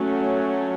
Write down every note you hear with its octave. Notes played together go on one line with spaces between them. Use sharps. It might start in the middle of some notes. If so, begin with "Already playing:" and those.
Already playing: F#3 A3 C#4